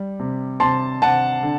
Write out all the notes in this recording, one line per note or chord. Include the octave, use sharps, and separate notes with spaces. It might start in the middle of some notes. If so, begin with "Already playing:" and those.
Already playing: G3
C3
C3 A5 C6
C3 F#5 A5
D3